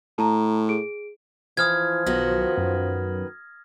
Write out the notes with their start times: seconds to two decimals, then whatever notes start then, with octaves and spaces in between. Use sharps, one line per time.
0.18 A2 A5 A#5
0.69 G#4 D7
1.57 E3 F3 D#6 F6 G#6
2.07 B1 D#3 B3 F#4 A#6
2.58 F#2